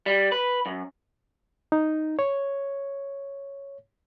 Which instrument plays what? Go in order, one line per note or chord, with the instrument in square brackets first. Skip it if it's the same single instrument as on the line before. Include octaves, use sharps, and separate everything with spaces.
[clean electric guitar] G3
B4
F#2
[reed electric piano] D#4
C#5